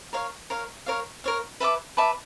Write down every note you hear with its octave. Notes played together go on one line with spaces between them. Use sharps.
A#4 C#5 F5
A#4 C#5 F5
A#4 C#5 F5
A#4 C#5 F5
B4 E5 A5 D6
B4 E5 A5 D6